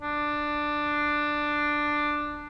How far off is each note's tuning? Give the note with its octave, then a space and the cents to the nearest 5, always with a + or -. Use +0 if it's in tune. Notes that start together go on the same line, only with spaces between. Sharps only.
D4 +10